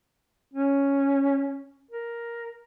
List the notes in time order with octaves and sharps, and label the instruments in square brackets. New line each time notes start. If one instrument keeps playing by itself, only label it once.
[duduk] C#4
A#4